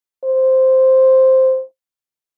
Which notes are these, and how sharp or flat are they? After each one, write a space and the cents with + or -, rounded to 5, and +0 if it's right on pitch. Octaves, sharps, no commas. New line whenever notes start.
C5 +0